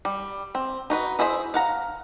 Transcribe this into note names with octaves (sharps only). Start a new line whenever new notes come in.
G3
C4
D#4 F#4 B4
E4 G#4 C5 D#5 E5
F5 F#5 A#5